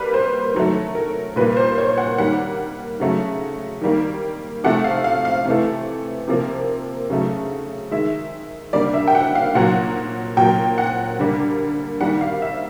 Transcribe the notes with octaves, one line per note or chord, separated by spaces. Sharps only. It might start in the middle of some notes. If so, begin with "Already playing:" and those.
Already playing: G3 A#3 B4
C5
D#3 F#3 A3
A#4
A#2 G3 A#3 B4
C5
C#5
F#5
D#3 G3 A#3 F#5
C#3 F#3 A3
D#3 G3 A#3
C3 F3 A3 F#5
F5
F5
F5
C3 E3 A3
C3 F3 A#3
C#3 F#3 A3
D#3 G#3 E5
D3 G3 A#3 D5
E5
G5
F#5
F5
A#2 F#3 A#3 F#5
A#2 F#3 A#3 G5
F#5
D3 G3 A#3
D#3 G3 A#3 F#5
F5
E5